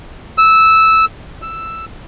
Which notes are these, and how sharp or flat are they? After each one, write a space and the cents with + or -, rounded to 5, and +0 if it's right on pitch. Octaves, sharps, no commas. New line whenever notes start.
E6 -10
E6 +5